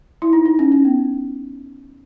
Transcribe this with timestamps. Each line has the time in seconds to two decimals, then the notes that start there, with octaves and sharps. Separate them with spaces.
0.22 E4
0.33 D#4
0.46 D#4
0.59 C#4
0.72 C#4
0.85 B3